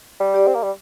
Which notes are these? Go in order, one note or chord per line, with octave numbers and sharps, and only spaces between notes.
G3
G4 D5
C4
A#3
G3